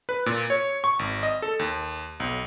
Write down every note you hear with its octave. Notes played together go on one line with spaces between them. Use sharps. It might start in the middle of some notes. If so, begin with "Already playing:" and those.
B4
A#2
C#5
C#6
G#1
D#5
A4
D#2
B1